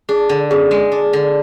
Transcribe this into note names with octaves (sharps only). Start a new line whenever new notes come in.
D4 G#4
D3
F#2 G#4
G#3
D4
D3